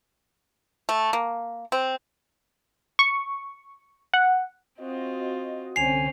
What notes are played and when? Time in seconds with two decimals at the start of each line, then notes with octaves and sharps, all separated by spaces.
0.89 A3
1.13 A#3
1.72 C4
2.99 C#6
4.14 F#5
4.78 C4 F4 F#4 D#5
5.76 C2 D3 C4 C#4 G#5 C7 F7